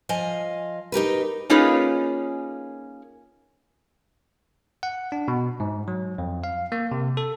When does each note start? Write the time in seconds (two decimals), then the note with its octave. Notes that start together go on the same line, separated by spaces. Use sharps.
0.09 F3 D#5 F5 G#5
0.92 D#4 G4 A#4 B4
1.50 A#3 C#4 D#4 F4 G#4 B4
4.83 F#5
5.12 D4
5.28 B2
5.60 G#2
5.88 F#3
6.18 F2
6.44 F5
6.72 A#3
6.91 C3
7.17 A4